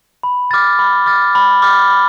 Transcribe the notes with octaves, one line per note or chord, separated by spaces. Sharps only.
B5
D6 F6 A6
B5
D6 F6 A6
B5
D6 F6 A6
B5